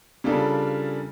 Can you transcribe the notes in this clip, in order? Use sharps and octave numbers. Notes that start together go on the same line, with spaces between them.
C#3 G3 D4 F4 A4 A#4